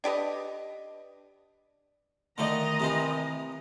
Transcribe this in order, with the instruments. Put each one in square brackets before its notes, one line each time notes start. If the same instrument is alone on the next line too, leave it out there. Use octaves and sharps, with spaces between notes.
[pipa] D4 G4 B4 D#5
[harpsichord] D3 A3 D#4 [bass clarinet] D#3 [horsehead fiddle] D#5 A#5
[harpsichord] C3 E3 C5